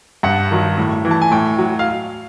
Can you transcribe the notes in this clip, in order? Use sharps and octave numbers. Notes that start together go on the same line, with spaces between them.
G2 F#5
D#3 F#3
A2
E3
A5
G#5
A2 G5
F#3
F5